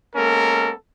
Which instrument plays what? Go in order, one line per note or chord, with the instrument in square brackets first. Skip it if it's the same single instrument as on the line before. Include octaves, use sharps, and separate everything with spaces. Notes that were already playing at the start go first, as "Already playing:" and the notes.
[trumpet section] G#3 A#3 B3 C#4 A4 A#4